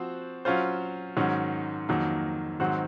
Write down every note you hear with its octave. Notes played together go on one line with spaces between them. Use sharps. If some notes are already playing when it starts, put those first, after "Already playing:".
Already playing: F3 C4 F#4 C5
F#3 C#4 F4 C5
G#2 D#3 F#3 C#4
F2 D#3 F#3 A#3
G#2 D#3 F#3 C4 F#4